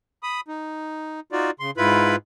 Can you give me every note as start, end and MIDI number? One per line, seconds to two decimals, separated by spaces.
0.23 0.41 83
0.23 0.41 87
0.48 1.20 63
1.32 1.51 63
1.32 1.51 65
1.32 1.51 66
1.32 1.51 74
1.60 1.71 49
1.60 1.71 84
1.77 2.16 44
1.77 2.16 64
1.77 2.16 65
1.77 2.16 71
1.77 2.16 83